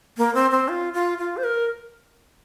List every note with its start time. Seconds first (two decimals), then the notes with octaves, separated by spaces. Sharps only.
0.18 A#3
0.35 C4
0.51 C4
0.68 F4
0.93 F4
1.18 F4
1.37 C5
1.44 A#4